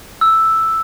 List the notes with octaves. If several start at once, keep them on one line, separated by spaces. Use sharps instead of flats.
E6